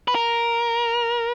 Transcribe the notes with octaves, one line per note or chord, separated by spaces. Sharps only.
B4
A#4